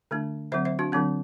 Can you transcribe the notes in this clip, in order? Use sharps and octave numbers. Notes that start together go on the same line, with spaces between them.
D3 A3 D4
D3 F#3 C4 C5 E5
C5 E5
D4 F#4
D3 F#3 C4 D4